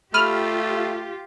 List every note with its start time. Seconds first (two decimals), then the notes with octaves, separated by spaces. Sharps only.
0.14 A3 F4 G4 B5 F6 D#7 F#7